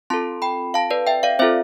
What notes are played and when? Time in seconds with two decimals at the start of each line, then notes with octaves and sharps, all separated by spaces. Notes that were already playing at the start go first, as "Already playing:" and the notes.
0.10 C4 F4 A4 A5 C6
0.42 G5 B5
0.74 F5 A5
0.91 B4 D5
1.07 E5 G5
1.23 D5 F5
1.39 C4 F4 A4 C5 E5